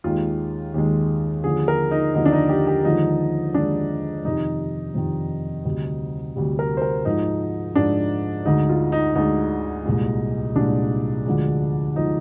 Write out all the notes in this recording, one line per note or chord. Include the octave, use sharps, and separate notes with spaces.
D#2 D#3 G#3 F4
D#2 D#3 G#3
D#2 D3 F3 G#4
A#4
D#4
D#2 D3 F3 D#4
D4
D#4
G4
G4
D#2 D3 F3 G#3 D#4
D#2 D3 F3 G#3 D4
F2 C3 D#3 D#4
F2 C3 D#3
D2 C3 G3
D2 C3 G3
A#4
C5
A#4
G#2 F3 G#3 D#4
G#2 F3 G#3 D4
D2 D3 G#3 D#4
F4
D#4
D2 D3 G#3 D#4
C2 A#2 G#3
C2 A#2 G#3 D4
D2 D3 F3 G#3
D3 F3 G#3 D#4